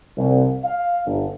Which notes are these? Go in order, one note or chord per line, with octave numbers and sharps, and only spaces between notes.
C2
F5
G1